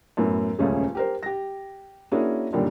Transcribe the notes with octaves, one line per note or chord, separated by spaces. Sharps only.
F#2 A2 B3
D#1 C#2 A3 C#4 G#4
G4 A#4 C5
G4 A#6
A#3 C#4 D4 E4 F#4 G#4
F#2 A#2 D3 D#3 G3